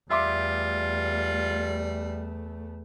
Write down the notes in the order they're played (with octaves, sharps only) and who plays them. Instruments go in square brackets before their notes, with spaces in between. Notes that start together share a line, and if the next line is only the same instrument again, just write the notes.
[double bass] E2 A3 [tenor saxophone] G3 [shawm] F4 [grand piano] E5 C6 D6